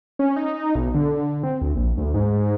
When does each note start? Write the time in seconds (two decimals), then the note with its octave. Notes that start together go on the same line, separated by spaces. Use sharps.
0.19 C#4
0.36 D#4
0.75 B1
0.94 D3
1.43 C4
1.61 D2
1.75 A#1
1.98 D2
2.14 G#2